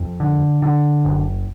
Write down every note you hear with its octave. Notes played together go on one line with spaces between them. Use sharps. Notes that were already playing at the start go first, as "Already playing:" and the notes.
Already playing: F2
D3
D3
F#1